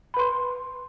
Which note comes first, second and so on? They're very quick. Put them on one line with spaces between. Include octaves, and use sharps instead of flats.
B5 B4 C6